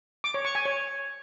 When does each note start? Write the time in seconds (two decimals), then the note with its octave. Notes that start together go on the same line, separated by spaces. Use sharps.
0.24 D6
0.34 C#5
0.45 C#6
0.55 G#5
0.65 C#5